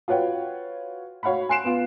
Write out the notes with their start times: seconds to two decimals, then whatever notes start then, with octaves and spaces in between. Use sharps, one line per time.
0.08 F4 F#4 B4 C#5 F#5 G5
1.23 F#4 C#5 F5 F#5 B5
1.49 G#5 C6 F#6 C7 D7 E7
1.64 B3 F4